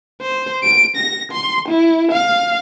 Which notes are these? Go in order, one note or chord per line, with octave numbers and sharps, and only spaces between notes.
C5
D7
A#6
C6
E4
F5